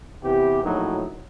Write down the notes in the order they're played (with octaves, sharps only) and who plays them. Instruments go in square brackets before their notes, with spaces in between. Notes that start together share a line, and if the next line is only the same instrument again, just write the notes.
[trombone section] C3 E3 B3 G4
A#1 F#2 A2 F#3 D#4